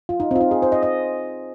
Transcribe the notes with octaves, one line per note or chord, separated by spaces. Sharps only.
F4
D#4
C4 F4
D#4
G#4
C5
D#5
D#5